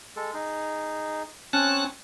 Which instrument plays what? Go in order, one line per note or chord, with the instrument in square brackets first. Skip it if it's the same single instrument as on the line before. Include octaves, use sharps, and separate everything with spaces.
[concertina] G#3 A4
D#4 G#4
[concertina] C4 G#5 C#6 [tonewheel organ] C#4 A5 F#6